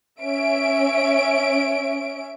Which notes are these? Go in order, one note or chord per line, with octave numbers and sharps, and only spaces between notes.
C#4 E5 D7